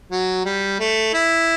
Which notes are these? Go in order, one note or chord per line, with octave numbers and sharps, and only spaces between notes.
F#3
G3
A3
E4